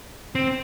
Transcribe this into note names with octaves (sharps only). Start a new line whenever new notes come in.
C4